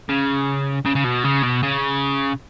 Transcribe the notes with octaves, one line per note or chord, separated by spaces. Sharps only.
C#3
C#3
C#3
B2
C#3
B2
C#3